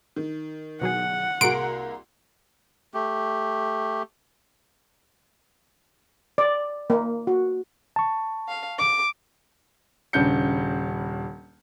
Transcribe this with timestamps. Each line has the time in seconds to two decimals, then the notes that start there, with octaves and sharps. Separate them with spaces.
0.16 D#3
0.81 B2 F#3 G#4 F#5
1.41 C2 A#3 F#4 G#4 A#5 C6 D7
2.94 A3 G4
6.38 D5
6.90 A#3
7.27 F#4
7.96 A5 C#6
8.48 F5
8.79 D6
10.13 D#1 C#3 D4 G6 C#7